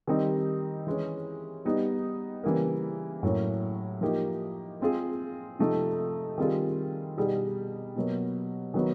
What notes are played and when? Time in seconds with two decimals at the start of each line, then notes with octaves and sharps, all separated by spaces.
0.07 D#3 G3 C4 D#4 G4
0.87 E3 G#3 C#4
1.65 G3 B3 D#4
2.44 C#3 E3 G3 A#3
3.23 A2 F#3 A#3 C#4
4.01 F3 A#3 D#4 G4
4.81 G#3 C4 F4 G#4
5.59 C3 F3 A3 C4 D#4
6.38 D#3 G3 C4 F4 G#4
7.17 B2 G3 B3 D#4 G#4
7.96 B2 F#3 A#3
8.74 D#3 F#3 B3 D#4 F#4